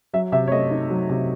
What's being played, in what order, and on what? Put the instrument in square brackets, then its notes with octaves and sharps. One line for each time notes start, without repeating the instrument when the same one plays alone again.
[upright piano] F#3 E5
C3 E5
C#5
A3 D#5
D#4
F#3
C3